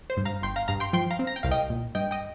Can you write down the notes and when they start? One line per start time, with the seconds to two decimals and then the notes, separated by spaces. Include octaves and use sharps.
0.10 C5
0.17 G2
0.25 F5 A#5
0.42 G1 G5 C6
0.56 F5 A#5
0.68 G2 F5 A#5
0.80 G5 C6
0.93 F3 G5 C6
1.11 F5 A#5
1.19 C4
1.27 A#5
1.36 G5
1.43 C2 F5
1.51 D#5 G5
1.70 A#2
1.95 G2 D#5 G5
2.11 D#5 G5